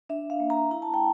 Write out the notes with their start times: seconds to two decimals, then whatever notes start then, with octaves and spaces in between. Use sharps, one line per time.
0.09 D4 E5
0.30 F5
0.40 A#3
0.50 A#5
0.71 E4 A#5
0.82 A5
0.94 G5